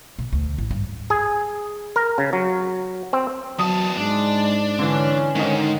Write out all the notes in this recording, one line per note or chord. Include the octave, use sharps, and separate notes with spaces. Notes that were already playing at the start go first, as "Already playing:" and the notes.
B2
D2
A1
G2
G#4
A#4
C#3
F#3
C4
E2 F#3 A5 D#6
G#2 G#3 D4
D3 E3 C#4
G#2 D3 D#3 D#4